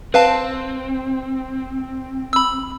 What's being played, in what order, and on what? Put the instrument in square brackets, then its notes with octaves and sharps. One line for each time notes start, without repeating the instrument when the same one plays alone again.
[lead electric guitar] C4 [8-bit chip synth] B4 F5 A5
[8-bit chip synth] B5 E6